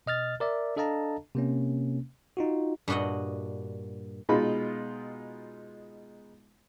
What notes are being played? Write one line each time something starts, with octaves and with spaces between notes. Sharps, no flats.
B2 D#5 F6 A6
A#4 D5 E5
D4 A4 D#5 F5 A5 A#5
C3 A#3 C#4
D#4 F4 F#4
G2 A#2 F#4 D#5 F#5
B2 G#3 D#4 F4 B5